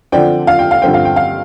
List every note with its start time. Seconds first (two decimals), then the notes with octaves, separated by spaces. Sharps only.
0.12 D3 F3 C4 D5 G5
0.47 F5
0.59 G5
0.71 F5
0.82 G2 D3 F3 C4 G5
0.94 F5
1.05 G5
1.16 F5